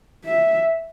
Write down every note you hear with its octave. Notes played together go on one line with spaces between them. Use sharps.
E5